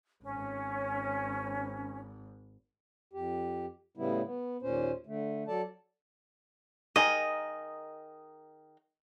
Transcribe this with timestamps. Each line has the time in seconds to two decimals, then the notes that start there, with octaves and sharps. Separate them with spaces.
0.23 G#1 C#4
3.13 F2 G4
3.97 A2 C#3 G3 B3 E4
4.24 B3
4.62 D#2 A#2 C#4 C5
5.06 D3 A3
5.48 F#3 A4 D5 A5
6.96 D#3 G#4 A#4 D#5